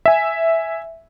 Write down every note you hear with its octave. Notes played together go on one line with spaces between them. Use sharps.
E5 G#5